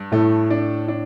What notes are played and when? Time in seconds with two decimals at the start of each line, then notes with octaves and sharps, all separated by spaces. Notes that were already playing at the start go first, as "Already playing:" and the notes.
Already playing: G2
0.12 A2 A3
0.50 D4
0.88 D4